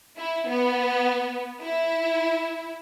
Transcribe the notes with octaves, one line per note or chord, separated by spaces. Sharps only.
E4
B3
E4